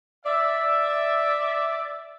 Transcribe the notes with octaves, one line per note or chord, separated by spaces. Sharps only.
D5 E5